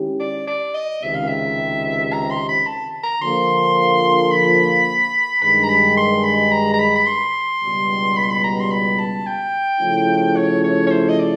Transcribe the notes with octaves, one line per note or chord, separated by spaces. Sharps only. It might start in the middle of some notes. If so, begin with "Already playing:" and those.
Already playing: D#3 G#3 C#4 E4 G4
D5
D5
D#5
C#2 C3 D#3 E5
F5
E5
A#5
C6
B5
A5
A#5
D3 F3 A#3 C6
B5
G2 D#3 G#3 B5
A#5
B5
C6
B5
A#5
A#5
B5
B5
C6
C#2 B2 G3
B5
C6
B5
A#5
C6
B5
A5
G5
C#3 F3 A3 C#4 E4
C#5
C#5
C#5
C5
D#5
D5